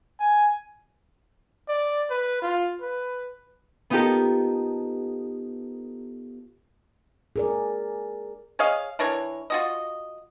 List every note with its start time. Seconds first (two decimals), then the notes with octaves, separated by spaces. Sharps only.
0.20 G#5
1.69 D5
2.10 B4
2.42 F4
2.82 B4
3.90 B3 D#4 F4 G4 A4 A#4
7.36 G#4 A#4 D5
8.59 G#4 C#5 D#5 F5
8.99 E3 D4 A#4 C#5
9.50 F4 F#4 D#5